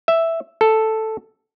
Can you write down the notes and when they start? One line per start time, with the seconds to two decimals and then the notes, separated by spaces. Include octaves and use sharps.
0.08 E5
0.61 A4